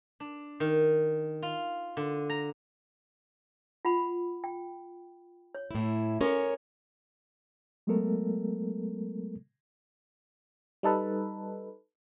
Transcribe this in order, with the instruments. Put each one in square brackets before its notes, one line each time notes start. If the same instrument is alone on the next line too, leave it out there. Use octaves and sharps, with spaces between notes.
[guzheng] D4
D#3
F4
D3
A#5
[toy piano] F4 F#5 B5
G5
C#5
[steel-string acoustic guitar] A2 E4
[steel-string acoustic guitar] C#4 A#4 C#5 [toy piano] F#4 A4
[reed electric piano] F#3 G#3 A3 B3 A4 A#4
[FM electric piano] G3 D#4 A4 B4